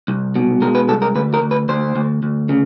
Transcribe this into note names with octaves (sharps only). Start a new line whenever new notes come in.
C2
B2
G#3 A#4
B4
C2 A4
A#4
D2 B4
A#4
D2
B4
D2 C5
D2
D2
C#3